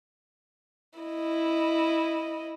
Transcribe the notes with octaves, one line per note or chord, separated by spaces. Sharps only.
E4 D#5